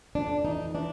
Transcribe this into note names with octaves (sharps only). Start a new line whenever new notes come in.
F2 D4
E3 D#4
E3 D4